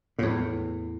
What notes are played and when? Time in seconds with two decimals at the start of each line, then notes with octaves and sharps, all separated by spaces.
0.19 E2 A2